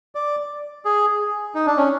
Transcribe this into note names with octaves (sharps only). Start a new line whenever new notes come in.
D5
G#4
D#4
D4
C#4